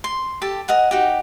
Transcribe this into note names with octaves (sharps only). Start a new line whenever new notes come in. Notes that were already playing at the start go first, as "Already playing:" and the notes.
C6
G4 A4 A5
A#4 D#5 F#5 G#5
D#4 F#4 G4